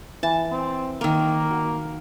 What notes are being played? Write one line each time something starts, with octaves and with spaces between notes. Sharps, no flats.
E3 A5
C4
D#3 A#3 A#4
F#4